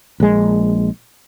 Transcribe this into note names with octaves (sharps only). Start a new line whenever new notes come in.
A#1 G#3